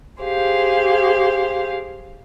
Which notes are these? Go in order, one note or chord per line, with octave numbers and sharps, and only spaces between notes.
G4 G#4 C5 F5